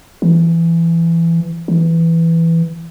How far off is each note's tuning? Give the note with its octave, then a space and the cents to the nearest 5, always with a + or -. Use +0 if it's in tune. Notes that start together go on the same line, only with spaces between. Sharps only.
E3 +20
E3 +5